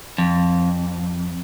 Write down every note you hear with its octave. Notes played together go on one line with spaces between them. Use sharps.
F2